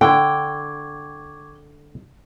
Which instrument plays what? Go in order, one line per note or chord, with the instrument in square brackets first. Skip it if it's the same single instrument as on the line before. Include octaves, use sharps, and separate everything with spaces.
[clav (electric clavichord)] D3 [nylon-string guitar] G5 [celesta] C#6 D6 G#6